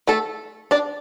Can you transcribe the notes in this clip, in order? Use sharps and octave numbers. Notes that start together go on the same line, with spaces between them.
A3 A4
D4 D5